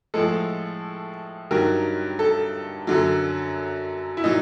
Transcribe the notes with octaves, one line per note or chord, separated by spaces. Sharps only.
A2 F3 G#3 A4
G2 D#3 F#3 A#4
A4
F#2 D3 F#3
E4
A#2 F#3 D#4